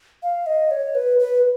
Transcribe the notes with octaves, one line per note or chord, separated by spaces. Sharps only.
F5
D#5
C#5
B4
B4